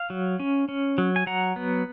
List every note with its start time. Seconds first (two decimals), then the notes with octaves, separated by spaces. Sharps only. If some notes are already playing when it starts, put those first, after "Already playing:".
Already playing: F5
0.10 F#3
0.40 C#4
0.69 C#4
0.98 F#3
1.16 G#5
1.27 F#3 F#5 A#5
1.56 B3